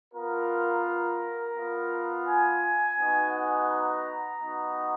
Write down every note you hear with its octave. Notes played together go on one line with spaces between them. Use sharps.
B3 F4 A#4
A#4
B3 F4
G#5
B3 D#4 F#4
A#5
B3 D#4 F#4